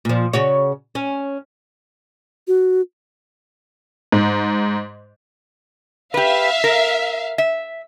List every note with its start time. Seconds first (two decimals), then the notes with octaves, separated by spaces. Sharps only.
0.05 A#2 F3
0.33 C#3 F#4 C#5
0.95 C#4
2.48 F#4
4.12 G#2
6.14 G4 B4 E5 F5
6.64 A#4
7.38 E5